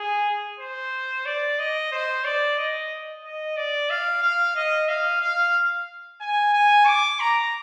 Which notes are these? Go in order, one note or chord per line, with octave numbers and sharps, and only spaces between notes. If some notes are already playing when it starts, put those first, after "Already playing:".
Already playing: G#4
C5
D5
D#5
C5
D5
D#5
D#5
D5
F5
F5
D#5
F5
F5
G#5
G#5
D6
A#5